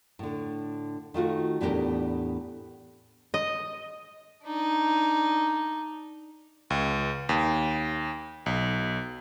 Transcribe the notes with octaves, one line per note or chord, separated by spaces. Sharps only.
A2 D3
D#3 A3 F4 F#4
E2 A2 B3 D4 G4 A#4
D#5
D4 D#4
C#2
D#2
B1